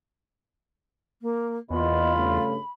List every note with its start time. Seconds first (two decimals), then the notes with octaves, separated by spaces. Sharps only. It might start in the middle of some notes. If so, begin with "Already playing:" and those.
1.22 A#3
1.70 E2 A#2 B3 F4 D#5 B5
2.14 G2 C#3 A3